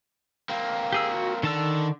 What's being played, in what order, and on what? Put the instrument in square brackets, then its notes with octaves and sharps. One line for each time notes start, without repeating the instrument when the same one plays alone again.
[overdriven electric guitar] A#3 C4
[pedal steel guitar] G4 G#4 E6
F#4
[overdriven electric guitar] D3 [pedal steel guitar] D#3 A5 E6